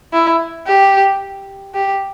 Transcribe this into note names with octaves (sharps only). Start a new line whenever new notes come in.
E4
G4
G4